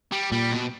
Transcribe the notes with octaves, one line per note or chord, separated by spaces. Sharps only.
G3
A#2 G3
B2